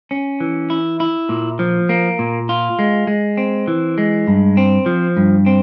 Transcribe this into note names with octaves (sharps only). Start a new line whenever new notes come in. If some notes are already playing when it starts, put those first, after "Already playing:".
C#4
E3
E4
E4
A#2
F3
A#3
A#2
F4
G#3
G#3
C4
E3
G#3
G2
C4
F3
G2
C4